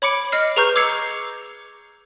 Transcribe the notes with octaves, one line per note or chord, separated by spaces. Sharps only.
C#5 B5 D6 C#7 D7
D#5 F6 C7
G#4 B4 A#5 C#6 F6 G6
D6 E6 G#6 C7 C#7